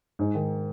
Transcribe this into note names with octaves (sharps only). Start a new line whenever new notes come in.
G#2
D#3